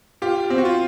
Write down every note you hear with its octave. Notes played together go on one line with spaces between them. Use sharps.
F4 G4
C4
F#4
F4